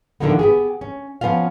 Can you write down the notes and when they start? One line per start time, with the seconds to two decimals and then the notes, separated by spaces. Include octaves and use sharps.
0.20 A2 D3 D#3 F3 A#3 B3
0.39 B3 G4 G#4
0.81 C#4
1.21 F3 B3 C#4 F4 F5